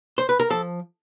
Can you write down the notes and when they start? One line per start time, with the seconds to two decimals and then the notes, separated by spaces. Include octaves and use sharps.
0.18 C5
0.29 B4
0.40 A#4
0.50 F3 A4